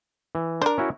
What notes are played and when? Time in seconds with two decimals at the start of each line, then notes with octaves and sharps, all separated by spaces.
0.35 E3
0.62 D4 A#4 C5
0.78 C#4 E4 F#4